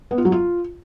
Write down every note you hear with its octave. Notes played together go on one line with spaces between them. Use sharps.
B3
F4
F#3
F4